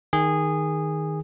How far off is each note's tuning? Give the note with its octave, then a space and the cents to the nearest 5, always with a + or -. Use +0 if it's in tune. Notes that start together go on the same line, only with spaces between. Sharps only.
D#3 +5 G#4 -15